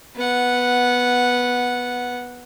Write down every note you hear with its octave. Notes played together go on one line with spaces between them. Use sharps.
B3 F#5